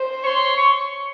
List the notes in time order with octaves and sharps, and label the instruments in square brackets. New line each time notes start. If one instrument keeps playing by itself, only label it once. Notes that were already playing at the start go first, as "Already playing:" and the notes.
Already playing: [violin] C5
[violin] C#5 [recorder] C#6
[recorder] C6
C#6